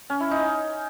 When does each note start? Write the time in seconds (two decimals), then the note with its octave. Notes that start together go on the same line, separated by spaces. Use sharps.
0.10 C#4
0.20 E4
0.31 D#4